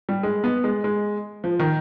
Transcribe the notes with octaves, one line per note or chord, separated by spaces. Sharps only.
G3
G#3
B3
G#3
G#3
F3
D#3